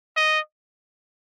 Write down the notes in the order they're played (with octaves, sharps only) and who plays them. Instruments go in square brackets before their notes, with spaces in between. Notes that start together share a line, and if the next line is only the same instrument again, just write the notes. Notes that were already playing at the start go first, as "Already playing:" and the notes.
[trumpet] D#5